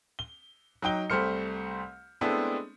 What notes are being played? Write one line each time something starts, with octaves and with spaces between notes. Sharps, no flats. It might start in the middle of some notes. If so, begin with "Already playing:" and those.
G7
F#3 D#4 G5 G7
C2 G3 A3 C5 F6 C#7
G#3 A3 B3 C4 D4 E4